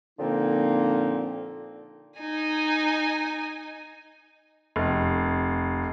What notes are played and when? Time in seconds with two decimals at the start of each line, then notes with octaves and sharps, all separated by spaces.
0.19 A#2 D3 F3 A#3 C4 D#4
2.20 D#4 G#5
4.76 F1